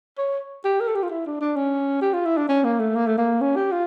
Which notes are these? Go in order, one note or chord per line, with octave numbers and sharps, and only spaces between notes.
C#5
G4
A#4
A4
G4
F4
E4
D4
D4
C#4
G4
F4
E4
D4
C#4
A#3
A3
A#3
A3
A#3
C#4
G4
F4